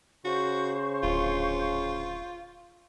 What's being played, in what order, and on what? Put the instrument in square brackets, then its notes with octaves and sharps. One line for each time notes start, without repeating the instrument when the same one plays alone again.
[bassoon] C#3 [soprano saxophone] F#4 [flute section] C5 C#6
[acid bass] D1 [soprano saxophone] F4